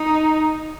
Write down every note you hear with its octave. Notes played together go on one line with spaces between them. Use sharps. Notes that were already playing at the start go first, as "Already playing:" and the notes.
Already playing: D#4